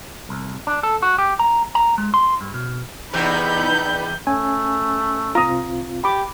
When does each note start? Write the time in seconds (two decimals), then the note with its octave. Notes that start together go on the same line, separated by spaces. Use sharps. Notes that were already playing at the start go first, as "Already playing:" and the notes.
0.29 C2
0.67 D4
0.83 A4
1.02 F#4
1.18 G4
1.39 A#5
1.75 A#5
1.98 G#3
2.14 C6
2.41 G2
2.54 B2
3.14 E2 C3 B3 D#4 B5 G6
4.27 A3 C#4 G#5
5.35 C2 C4 F4 A#5 D#6
6.04 G4 B5 D6